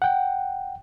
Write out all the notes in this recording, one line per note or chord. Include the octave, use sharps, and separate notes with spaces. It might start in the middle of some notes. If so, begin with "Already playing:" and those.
F#5 G5